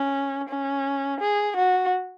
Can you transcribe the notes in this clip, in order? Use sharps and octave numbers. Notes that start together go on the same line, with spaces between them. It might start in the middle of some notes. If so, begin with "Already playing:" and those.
Already playing: C#4
C#4
G#4
F#4